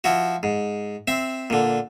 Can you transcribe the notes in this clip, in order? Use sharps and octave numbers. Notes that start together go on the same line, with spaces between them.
F3 E4 F#4
G#2
C4 E5
A#2 D3